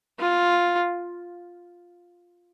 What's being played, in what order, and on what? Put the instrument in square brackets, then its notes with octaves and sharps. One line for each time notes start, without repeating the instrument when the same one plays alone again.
[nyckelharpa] F4